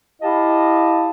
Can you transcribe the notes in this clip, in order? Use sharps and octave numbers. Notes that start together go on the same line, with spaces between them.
E4 G4 D#5 F5 A5